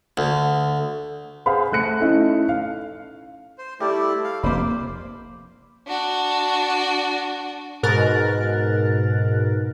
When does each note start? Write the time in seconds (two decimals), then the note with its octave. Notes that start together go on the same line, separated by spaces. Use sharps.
0.17 D2
1.46 G#4 C5 F5 F#5 B5
1.72 A3 F#6 C#7
2.01 A3 C#4 D#4 E4
2.49 F5
3.58 C5
3.80 G3 A3 E4 G4 D5
4.24 F5
4.43 F1 A#3 C5 B5 D6
5.87 D4 F#4
7.83 G#2 B2 A#4 F#6 A6